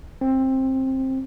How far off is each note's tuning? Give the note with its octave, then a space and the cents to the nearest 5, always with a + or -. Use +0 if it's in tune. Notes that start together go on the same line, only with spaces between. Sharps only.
C4 +15